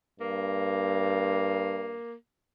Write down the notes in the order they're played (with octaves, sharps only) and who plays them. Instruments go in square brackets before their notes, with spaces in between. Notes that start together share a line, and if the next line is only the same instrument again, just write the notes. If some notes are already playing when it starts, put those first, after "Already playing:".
[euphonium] G2 [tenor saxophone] A#3